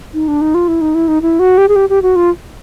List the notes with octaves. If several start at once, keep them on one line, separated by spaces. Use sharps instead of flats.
D#4
D4
D#4
F4
E4
D#4
E4
D#4
E4
F#4
G4
G#4
G4
G4
F#4
F4